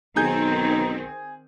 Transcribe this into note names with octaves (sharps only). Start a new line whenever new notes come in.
B1 D#3 C4 D#4 G#4 G6